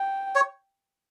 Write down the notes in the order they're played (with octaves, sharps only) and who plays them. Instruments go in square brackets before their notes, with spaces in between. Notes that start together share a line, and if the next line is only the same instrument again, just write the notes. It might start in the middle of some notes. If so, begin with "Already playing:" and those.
Already playing: [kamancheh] G5
[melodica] C#5